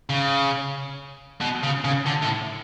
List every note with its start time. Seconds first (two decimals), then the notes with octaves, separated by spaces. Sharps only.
0.09 C#3
1.41 B2
1.63 C#3
1.85 C#3
2.07 D3
2.23 A2